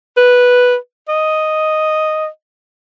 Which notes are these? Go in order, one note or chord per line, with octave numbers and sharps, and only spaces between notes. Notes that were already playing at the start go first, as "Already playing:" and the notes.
B4
D#5